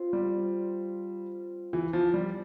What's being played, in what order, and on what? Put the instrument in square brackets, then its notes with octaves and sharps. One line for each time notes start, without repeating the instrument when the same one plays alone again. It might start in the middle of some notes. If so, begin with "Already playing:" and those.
Already playing: [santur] C4 F4 C5
[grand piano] G3
E3
F3
G3